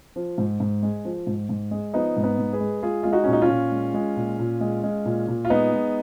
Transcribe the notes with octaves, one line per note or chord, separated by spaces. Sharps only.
F3
G#2
G#2
G#3
F3
G#2
G#2
G#3
F3 B3 D#4
G#2
B3 D#4
G#2
G#4 B4
G#3
G#3 F4 G#4
G#3 F4
D#4 F#4
A#2 C#4
D#4
C#4 F4
A#2
G#3
G#3
A#2
A#2
G#3
G#3
A#2
A#2
F4
G#3 B3 D#4
G#3